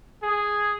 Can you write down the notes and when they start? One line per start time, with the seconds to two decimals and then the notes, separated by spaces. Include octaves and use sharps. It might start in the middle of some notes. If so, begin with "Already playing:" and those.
0.23 G#4